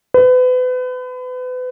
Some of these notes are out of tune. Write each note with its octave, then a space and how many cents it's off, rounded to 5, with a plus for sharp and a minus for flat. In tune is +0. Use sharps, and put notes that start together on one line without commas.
B4 +35